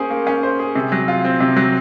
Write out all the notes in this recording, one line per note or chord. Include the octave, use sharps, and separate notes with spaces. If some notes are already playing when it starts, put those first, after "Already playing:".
Already playing: A#3 C#4 G#4 C5
A#3
C#4
C5
G#4
C3
F#3
F4
C4
C3
F#3